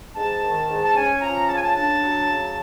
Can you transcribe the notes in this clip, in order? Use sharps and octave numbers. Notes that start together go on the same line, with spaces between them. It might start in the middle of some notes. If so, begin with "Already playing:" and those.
G#2 A5
D#3
G#2
A5
C#4 G#5
F3 A#5
C#3 A5
G#5
A5
D4 A5
F#3
C#3